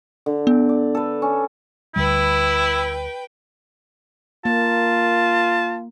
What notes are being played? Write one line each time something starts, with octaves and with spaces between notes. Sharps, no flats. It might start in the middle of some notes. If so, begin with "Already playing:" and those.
D3
B3
D5
A4 B4
C#4
D2 D3 G3 E4 B4 G5
A#3 F4 A5